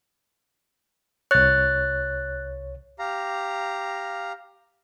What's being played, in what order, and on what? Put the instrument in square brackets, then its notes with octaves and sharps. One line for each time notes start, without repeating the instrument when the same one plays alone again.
[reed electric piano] C2 C#5 [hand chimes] F#6 A6
[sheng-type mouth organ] G4 F5 A#5